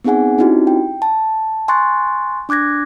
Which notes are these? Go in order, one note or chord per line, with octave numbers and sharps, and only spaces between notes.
B3 C4 D#4 G#4 F#5 G#5
C4 C#4 D#4 E4 F#4 G4
G5
A5
G#5 C6 C#6 F#6 A6
D4 D6 F#6 G#6 A#6